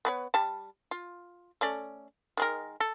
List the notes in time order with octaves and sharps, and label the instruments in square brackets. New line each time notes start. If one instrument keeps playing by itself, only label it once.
[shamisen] B3 B4 C#5
G3 A5
F4
A3 C#4 D5
D#3 G#3 A#4
A4